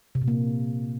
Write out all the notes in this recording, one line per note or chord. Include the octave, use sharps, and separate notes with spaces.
C3
A#2
A#3